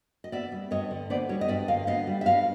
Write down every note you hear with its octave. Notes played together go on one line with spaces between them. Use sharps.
D#5
B3 D5 E5
G3
G2 C#5 D#5
D3
B3 C5 D5
G3 C#5 D#5
D#5
G2 D5 E5
D3 D#5 F5
B3 D#5 F5
G3
E5
G2 D#5 F5